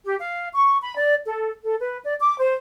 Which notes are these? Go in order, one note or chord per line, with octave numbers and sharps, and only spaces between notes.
G4
F5
C#6
B5
D5
A4
A4
B4
D5
D6
C5